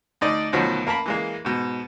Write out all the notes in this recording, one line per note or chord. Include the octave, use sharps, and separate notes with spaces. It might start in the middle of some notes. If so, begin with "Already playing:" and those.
D2 D#4 D5
D2 B2 D#3 F3 F#3
A#3 A#4 A5 B5
E3 G#3 A#3
G#2 B2